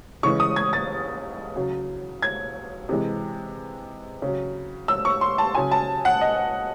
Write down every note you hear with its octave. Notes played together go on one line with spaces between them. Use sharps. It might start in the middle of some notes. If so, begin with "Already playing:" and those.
C#3 E3 G#3 C#6
D#6
G#6
A6
C#3 F#3
G#6
C3 E3 G#3
C#3 F#3
E6
C#6
C6
A5
C#3 F#3 G#5
A5
F#5
D#5